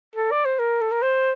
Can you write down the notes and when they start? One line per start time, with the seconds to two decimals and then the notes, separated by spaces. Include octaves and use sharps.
0.16 A4
0.32 D5
0.45 C5
0.59 A#4
0.81 A4
0.91 A#4
1.02 C5